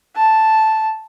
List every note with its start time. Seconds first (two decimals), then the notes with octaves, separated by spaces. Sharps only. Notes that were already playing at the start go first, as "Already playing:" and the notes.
0.16 A5